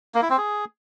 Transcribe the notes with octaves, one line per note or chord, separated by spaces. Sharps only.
A#3
E4
C4
G#4